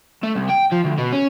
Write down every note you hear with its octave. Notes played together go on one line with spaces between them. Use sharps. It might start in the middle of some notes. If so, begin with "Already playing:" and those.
A3
C2
G5
F3
D2
B2
C#4